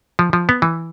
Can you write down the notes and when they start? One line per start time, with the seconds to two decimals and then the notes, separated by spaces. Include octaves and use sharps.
0.19 F3
0.33 F3
0.49 B3
0.62 E3